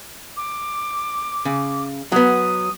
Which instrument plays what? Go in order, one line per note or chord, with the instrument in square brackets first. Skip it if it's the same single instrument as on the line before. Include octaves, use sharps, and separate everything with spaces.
[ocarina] D6
[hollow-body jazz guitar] C#3
[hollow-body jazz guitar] F#3 B3 [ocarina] D#6